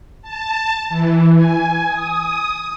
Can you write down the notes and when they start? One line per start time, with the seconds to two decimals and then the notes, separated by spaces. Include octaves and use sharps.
0.22 A5
0.89 E3
1.35 G#5
1.88 D#6